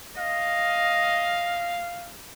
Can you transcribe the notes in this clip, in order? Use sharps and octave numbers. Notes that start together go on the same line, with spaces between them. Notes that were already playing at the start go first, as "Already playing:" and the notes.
D#5 F5